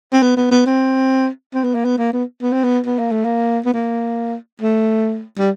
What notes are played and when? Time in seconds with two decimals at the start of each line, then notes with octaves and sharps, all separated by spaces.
0.13 C4
0.22 B3
0.36 B3
0.51 B3
0.66 C4
1.54 C4
1.64 B3
1.74 A#3
1.85 B3
1.98 A#3
2.13 B3
2.42 B3
2.53 C4
2.64 B3
2.86 B3
2.99 A#3
3.12 A3
3.24 A#3
3.65 B3
3.74 A#3
4.61 A3
5.38 G3